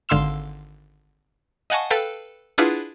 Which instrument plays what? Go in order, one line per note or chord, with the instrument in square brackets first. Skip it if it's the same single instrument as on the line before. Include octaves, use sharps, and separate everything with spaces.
[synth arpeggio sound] G#1 D3 F5 C6 E6 E7
D#5 F5 F#5 G#5 A5 C#6
A4 B4 F5 G5
D4 E4 F4 G#4 B4 F#5